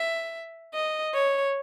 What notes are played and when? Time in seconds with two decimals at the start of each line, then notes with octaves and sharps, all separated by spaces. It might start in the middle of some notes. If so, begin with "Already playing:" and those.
Already playing: E5
0.73 D#5
1.14 C#5